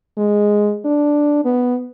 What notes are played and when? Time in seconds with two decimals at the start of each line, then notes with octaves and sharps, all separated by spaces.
0.18 G#3
0.85 D4
1.45 B3